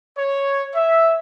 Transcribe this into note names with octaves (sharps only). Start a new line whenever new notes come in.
C#5
E5